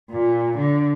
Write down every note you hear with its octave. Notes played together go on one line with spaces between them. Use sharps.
A#2
D3